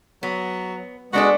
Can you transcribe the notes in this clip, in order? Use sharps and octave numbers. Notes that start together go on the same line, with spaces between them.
F#3 B3
G#3 B3 D4 F#4 A4